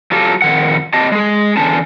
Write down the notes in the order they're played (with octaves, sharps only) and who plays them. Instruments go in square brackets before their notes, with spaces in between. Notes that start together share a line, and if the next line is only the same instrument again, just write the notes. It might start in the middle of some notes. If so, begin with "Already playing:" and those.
[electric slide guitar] F#3 F4 G4 A4
F2 D#3 F#5
C4 G4 D#5 A5
G#3 G#4
E2 D3 C#4 A5